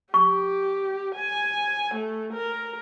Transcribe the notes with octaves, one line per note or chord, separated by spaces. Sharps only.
G4 C#6
G#5
A3
A#4